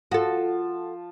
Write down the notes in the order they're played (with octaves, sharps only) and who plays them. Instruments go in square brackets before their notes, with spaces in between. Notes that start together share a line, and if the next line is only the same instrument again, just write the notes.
[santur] F3 A5 [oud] F#4 A4